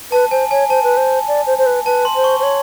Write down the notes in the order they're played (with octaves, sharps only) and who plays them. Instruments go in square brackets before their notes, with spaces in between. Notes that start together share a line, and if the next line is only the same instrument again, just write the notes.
[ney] B4 [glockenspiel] A5
[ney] C5 [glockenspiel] G#5
[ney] C#5 [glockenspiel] G#5
[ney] C5 [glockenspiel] A5
[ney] B4
C5
D5
C5
C5
B4
[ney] B4 [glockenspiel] A5
[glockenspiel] C6
[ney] C5
[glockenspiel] C#6
[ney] C5
[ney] C#5 [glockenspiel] C6